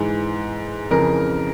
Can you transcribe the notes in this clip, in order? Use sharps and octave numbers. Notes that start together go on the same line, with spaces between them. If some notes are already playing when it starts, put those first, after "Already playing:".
Already playing: G#2 E3
F2 C#3 E3 A#4